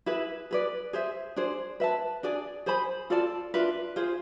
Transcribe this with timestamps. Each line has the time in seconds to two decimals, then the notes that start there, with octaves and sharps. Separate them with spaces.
0.06 E4 G#4 B4 E5
0.51 G#4 B4 D5
0.93 G#4 C5 E5
1.36 D4 G#4 C5
1.80 B4 E5 A5
2.23 D4 G#4 D5 G#5
2.66 G#4 C5 G#5 B5
3.10 F4 A4 D5 A5
3.54 D4 F4 B4 E5
3.96 F4 G#4 C5